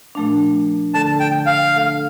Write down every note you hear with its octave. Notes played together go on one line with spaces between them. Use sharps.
A#2 F3 A3 D4
D2 D3 A3 D4 A4 A5
G5
F5
D2 D3 A3 D4 A4